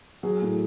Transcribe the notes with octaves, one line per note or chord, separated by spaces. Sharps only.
F#3 G#4
A2